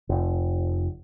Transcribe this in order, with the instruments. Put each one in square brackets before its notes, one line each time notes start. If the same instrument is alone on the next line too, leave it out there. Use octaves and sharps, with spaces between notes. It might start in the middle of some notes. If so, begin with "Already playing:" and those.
[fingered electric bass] F1